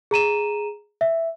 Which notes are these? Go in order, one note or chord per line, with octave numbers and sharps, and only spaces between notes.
G#4 A#5 D#7 E7
E5